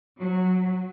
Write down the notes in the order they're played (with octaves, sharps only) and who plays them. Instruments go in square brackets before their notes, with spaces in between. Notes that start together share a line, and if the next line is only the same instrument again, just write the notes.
[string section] F#3